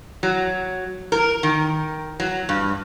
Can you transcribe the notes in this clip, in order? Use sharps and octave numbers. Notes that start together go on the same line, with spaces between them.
F#3
A#4
D#3
F#3
G2